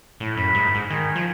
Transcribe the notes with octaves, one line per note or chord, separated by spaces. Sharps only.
A2
F#2 B5
G#2
G#2
D#3 G#5
F3